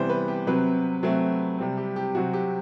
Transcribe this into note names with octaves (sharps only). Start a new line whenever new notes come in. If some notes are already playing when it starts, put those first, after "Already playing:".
Already playing: C3 E3 G3 B3 C5
B4
G4
C3 F#3 C4 B4
C3 F#3 A3 C4
C3 G3 C4
G4
G4
C3 F#3 C4 F#4
G4